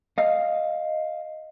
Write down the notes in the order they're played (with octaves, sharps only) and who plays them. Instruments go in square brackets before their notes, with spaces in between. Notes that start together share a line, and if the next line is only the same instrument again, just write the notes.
[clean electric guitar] D#5 F5